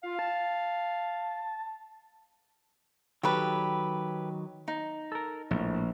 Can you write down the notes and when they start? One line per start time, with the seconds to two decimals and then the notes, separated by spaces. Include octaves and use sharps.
0.03 F4 F5
0.19 A5
3.23 D#3 F#3 G4 A4 B4
4.68 D#4
5.12 A4 A#4
5.51 A#1 A2